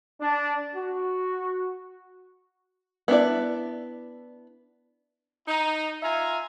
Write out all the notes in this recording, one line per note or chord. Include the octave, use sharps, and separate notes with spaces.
D4
F#4
B3 D4 E4 D5
D#4
F4 E5 G#5 A#5